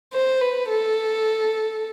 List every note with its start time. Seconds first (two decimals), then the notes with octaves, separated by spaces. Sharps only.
0.13 C5
0.41 B4
0.69 A4